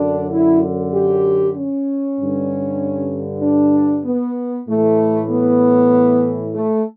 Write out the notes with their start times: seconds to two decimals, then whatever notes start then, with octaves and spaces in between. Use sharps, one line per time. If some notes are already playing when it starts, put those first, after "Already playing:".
Already playing: F#2 D3 D4
0.32 E4
0.93 G4
1.56 C#4
2.18 G2 D3
3.42 D4
4.05 B3
4.67 A2 E3 A3
5.30 B3
6.54 A3